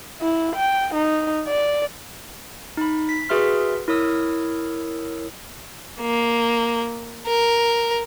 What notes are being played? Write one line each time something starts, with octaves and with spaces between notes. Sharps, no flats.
E4
G5
D#4
D5
D#4 B5
B6
F#4 G#4 B4 E5 C6 F6
E4 A#4 C#5 D#6 E6
A#3
A#4